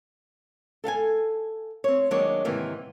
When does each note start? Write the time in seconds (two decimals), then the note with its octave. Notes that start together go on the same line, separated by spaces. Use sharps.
0.84 A4 F5 F#5 G#5
1.84 C4 C#5
2.11 D#3 F#3 G#3 A#3 D4 C#5
2.45 G#2 C3 D#3 E3 A#3